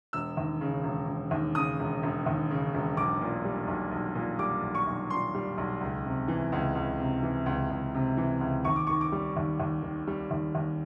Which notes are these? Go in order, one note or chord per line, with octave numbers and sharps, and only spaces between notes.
E1 E6
D#2
C#3
E1
E1
D#2
C#3 D#6
E1
E1
D#2
C#3
E1
B1 D6
A#2
G3
B1
B1
A#2
G3 D6
B1
C#6
B1
A#2 C6
G3
B1
C#2
C3
E3
C#2
C#2
C3
E3
C#2
C#2
C3
E3
C#2
D#2 C#6
D6
D#3 C#6
D6
G3
D#2
D#2
D#3
G3
D#2
D#2